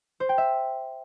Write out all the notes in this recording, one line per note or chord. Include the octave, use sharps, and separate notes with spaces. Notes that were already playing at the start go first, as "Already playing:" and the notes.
C5
G5
E5